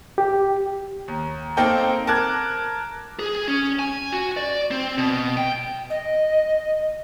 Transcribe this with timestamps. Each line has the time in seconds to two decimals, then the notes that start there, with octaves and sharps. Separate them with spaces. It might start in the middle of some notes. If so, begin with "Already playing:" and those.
0.18 G4
1.08 D#2
1.57 A#3 C4 D#4 A4 A#4 G5
2.07 A#4 A5 D6 F#6 G#6
3.19 G#4
3.48 C#4
3.79 G#5
4.12 F#4
4.37 D5
4.71 C4
4.98 B2
5.37 G5
5.90 D#5